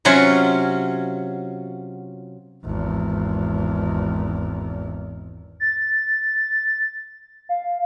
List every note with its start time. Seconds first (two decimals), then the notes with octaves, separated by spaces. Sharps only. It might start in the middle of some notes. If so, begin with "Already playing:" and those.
0.05 C3 F#3 C#4 F4 F#5
2.64 G#1 E2
5.60 A6
7.49 F5